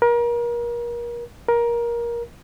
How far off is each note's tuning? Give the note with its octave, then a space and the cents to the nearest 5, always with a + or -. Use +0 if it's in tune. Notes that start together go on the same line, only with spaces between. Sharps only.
A#4 +35
A#4 +20